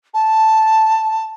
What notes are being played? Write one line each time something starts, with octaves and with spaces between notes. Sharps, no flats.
A5